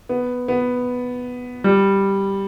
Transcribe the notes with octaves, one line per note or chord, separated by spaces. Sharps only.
B3
B3
G3